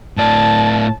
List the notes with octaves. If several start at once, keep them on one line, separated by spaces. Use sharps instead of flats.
A2 D5 A5